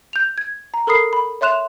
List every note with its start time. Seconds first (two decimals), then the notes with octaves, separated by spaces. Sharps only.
0.13 G6 F7
0.38 G#6
0.74 A#5
0.87 A4 A#4 B5 D#6 C7
1.13 B5
1.41 C#5 E5 C6 F#6 E7 F7